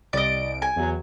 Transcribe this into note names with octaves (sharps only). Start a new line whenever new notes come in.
C2 D5 D#5 D7
G#5
E2 F#3